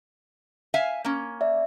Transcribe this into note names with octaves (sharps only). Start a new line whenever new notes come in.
E5 F5 G#5
A#3 C#4
D5 E5